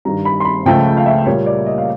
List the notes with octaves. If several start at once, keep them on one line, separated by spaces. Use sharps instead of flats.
G2 D#3 G3 A#5
B5
C6
B5
C#2 C#3 F3 A3 G5
F5
E5
A#2 G3 A#3 C#5
D5
D#5
F5